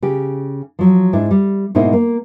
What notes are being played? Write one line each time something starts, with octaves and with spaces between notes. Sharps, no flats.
C#3 G4
F3 F#3
G#2 D4 E4
G3
G#2 B2 A#3 D#4 E4 C5
A#3